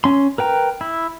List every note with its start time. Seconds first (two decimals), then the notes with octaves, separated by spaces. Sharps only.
0.04 C#4 C6
0.38 A#4 B4 G5 A#5
0.81 E4